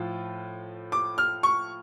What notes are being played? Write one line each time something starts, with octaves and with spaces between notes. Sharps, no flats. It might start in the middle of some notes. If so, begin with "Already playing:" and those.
Already playing: A2 F3 F4
D6
F6
C#6